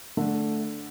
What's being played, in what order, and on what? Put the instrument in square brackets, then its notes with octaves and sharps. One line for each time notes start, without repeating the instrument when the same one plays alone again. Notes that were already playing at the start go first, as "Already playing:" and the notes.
[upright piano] D3 [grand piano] A3